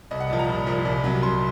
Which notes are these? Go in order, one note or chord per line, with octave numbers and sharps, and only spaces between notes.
C2 D#5
F#5
A#2 F3 A5
A#5
C2
A#2 F3
C2
C3 F#3
C2 C6